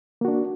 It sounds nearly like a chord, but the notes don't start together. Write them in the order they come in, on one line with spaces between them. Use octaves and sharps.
A#3 F#4 D4